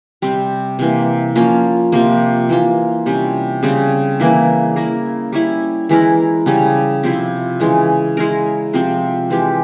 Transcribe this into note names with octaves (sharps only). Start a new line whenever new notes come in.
C3 G3 C4
C3 E3 A#3
F3 A#3 C#4 F4
C3 F3 A#3
E3 A#3 F4
C3 G3 C#4
C#3 G3 C4
E3 A#3 E4
A#3 E4 A#4
G3 C#4 E4
E3 G#3 E4 A#4
C#3 G3 C#4
C3 F3 C4 E4
C#3 E3 G#3
G#3 E4 A#4
C3 F3 C4
E3 G#3 C4 G4